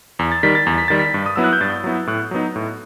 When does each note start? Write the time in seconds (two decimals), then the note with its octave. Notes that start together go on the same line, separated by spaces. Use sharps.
0.19 E2
0.32 A6
0.43 D#3 G3 B6
0.55 A6
0.67 E2
0.78 B6
0.88 D#3 G3 A6
0.99 B6
1.14 G2
1.26 D#6
1.36 F#3 B3 E4 E6
1.44 F#6
1.53 G6
1.61 G2 A6
1.84 F#3 B3 E4
2.07 A2 F#6
2.31 F#3 B3 D#4
2.56 A2